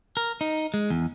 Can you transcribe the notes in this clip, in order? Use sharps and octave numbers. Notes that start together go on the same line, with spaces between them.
A#4
D#4
G#3
E2